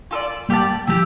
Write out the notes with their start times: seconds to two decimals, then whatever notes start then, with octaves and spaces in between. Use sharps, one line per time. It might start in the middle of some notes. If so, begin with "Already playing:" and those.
0.11 F4 A4 D5
0.49 G3 A#3 G4 D5 F5 A5
0.87 F3 A3 E4 G4